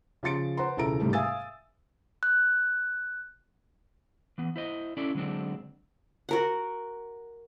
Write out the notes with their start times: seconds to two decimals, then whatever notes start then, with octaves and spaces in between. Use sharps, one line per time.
0.23 C#3 F3 C6 A6 C#7 D7
0.57 B4 C5 F#5 A#5 C6
0.77 E1 C#2 E4 A4 A#5 D7
1.00 G#2 C3 G3 A3
1.13 E5 F5 G#5 D#6 E6 A6
2.23 F#6
4.38 E3 B3
4.56 E4 C5 D#5
4.97 C#4 E4 A4 D5
5.15 D3 F#3 G#3 C4 D4
6.29 F#4 A#4 F#5